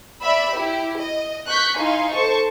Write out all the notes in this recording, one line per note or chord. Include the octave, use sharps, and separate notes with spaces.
D5 E5 B5 E6
E4 G4
D#5
C#6 F#6 G6 B6
D#4 E4 F5 G#5 C6
A4 C5 A5 C#6